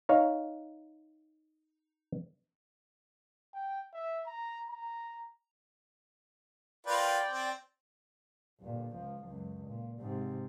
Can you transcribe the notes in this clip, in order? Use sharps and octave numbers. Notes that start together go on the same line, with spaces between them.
D#4 C#5 F5
G5
E5
A#5
A#5
F4 A#4 B4 D5 G5
C4
G1 A#2
C#2 F3
C#2 F#2
A#2
G#2 C3